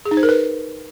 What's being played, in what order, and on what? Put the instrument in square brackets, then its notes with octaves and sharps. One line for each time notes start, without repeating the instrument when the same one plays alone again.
[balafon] G#4
D#4
C5
A#4
B4